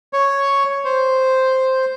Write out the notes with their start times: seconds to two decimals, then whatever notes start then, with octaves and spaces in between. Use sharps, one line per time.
0.13 C#5
0.85 C5